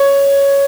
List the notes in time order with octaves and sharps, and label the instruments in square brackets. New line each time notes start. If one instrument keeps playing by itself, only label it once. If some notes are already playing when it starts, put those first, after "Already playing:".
Already playing: [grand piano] C#5